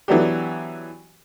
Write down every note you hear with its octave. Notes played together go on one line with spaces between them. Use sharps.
E3 F#3 B3 D4 F#4 G4